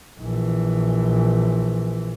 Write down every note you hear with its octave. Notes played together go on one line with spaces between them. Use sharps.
A#1 E3